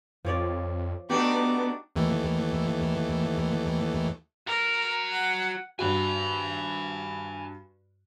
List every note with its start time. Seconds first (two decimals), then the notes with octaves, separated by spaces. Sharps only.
0.25 F2 F3 C#5 D5
1.10 A3 B3 D4 D#4 F#4 G4 D6
1.96 D#2 E3 A3
4.47 F#4 A#4 A#5
5.11 F#5
5.79 G2 F#4 G#5 B5